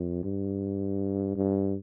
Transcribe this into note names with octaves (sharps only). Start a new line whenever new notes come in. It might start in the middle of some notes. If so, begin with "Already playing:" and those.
Already playing: F2
G2
G2